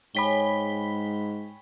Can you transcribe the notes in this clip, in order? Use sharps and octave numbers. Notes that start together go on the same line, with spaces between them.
G#2 G#4 C#5 G5 B5 B6 G7